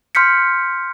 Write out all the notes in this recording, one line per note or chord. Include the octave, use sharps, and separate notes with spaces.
C6 F6 G6 B6 C#7